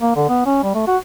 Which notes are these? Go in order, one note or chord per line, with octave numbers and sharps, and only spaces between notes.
A#3
D3
B3
C#4
G3
A3
F#4